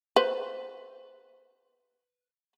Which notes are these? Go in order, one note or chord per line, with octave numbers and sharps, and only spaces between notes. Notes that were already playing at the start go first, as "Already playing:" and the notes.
B4 C5